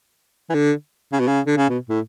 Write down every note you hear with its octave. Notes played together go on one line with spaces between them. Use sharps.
E3
D3
C#3
B2
C#3
D3
C#3
B2
A2